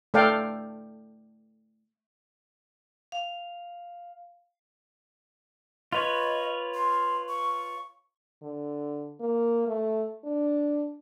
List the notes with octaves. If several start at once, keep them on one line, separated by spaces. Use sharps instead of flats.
A3 A4 D5 F5 G5
F5
F4 B4 C#5 D#5
C6
C#6
D3
A#3
A3
D4